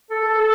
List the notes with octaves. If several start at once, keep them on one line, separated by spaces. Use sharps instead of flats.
A4
A4
A4